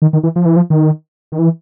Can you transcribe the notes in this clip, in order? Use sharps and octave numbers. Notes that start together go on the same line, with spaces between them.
D#3
D#3
E3
F3
E3
F3
D#3
D#3
E3